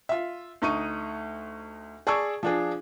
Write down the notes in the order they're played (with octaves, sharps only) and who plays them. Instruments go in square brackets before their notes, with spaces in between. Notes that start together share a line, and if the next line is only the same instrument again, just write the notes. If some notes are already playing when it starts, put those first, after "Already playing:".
[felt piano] F4 E5
D2 D#4 C#6 D#7
G#4 D5 A5 C#6 E6 G#6
F3 D4 G#4